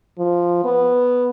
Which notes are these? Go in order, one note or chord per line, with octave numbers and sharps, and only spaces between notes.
F3
B3